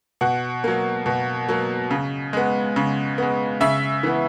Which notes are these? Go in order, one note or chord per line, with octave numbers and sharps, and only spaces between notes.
B2 F#5
F#3 A#3
B2
F#3 A#3
C#3
G#3 B3
C#3
G#3 B3
C#3 E5
E3 B3